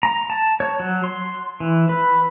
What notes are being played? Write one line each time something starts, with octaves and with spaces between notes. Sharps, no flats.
A#5
A5
C#5
F#3
C6
E3
B4